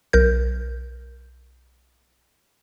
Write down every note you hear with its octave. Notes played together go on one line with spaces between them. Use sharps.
B1 A#4 G6